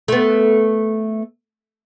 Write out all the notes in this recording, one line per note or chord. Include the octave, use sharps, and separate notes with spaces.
A3 B3